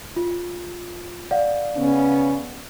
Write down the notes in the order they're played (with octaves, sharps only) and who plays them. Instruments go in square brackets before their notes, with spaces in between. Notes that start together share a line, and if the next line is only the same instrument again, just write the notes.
[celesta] F4
D5 F5 F#5
[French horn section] C#3 B3 C#4